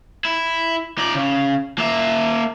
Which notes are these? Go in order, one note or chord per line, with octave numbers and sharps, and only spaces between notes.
E4
D#4 D5
C#3
A#3 E5